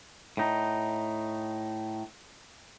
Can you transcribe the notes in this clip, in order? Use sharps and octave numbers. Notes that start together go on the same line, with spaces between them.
A2 D#4